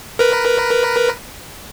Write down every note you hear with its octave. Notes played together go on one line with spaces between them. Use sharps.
A#4 B4